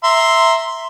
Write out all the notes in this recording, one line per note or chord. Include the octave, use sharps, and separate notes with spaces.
E5 A#5 C6